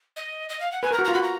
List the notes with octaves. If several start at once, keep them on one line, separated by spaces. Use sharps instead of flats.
D#5
D#5
F5
F#5
B4 G#5
A#4 A#5
F#4
F4 A#5
F#4 B5
A#5